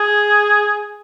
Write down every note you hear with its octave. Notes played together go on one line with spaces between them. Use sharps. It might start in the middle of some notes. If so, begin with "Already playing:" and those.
Already playing: G#4